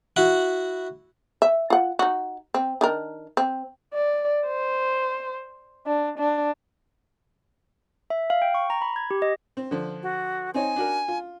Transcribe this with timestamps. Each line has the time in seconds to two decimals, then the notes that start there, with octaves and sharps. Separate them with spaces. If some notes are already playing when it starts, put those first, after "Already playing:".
0.16 E4 F#4 F#5
1.42 E5
1.70 F4 F#5
1.99 D#4 F#4
2.54 C4
2.81 D#3 D4 A#4
3.37 C4
3.94 D5
4.47 C5
5.87 D4
6.18 D4
8.10 E5
8.30 F5
8.42 G5
8.54 C#6
8.70 A#5
8.82 B5
8.96 G#6
9.11 G4
9.22 D#5
9.57 C4
9.71 D3 F3
10.03 F#4
10.54 C4 D#4 C#5 G#5
10.76 D4 F#4 A#4
11.08 F4